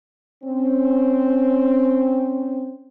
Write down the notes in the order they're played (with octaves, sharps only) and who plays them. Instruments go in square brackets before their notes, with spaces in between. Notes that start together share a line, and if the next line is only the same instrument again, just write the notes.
[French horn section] C4 C#4